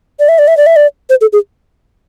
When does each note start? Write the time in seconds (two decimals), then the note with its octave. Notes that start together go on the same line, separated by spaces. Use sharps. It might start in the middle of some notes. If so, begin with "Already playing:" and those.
0.19 D5
0.29 E5
0.39 D5
0.48 E5
0.57 D5
0.66 E5
0.76 D5
1.10 C5
1.21 A4
1.33 G#4